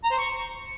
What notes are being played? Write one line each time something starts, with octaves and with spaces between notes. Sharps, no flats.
A#5
C5
C#6